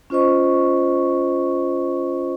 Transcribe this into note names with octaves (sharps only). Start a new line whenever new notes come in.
C#4 F4 C5 D#5 C#6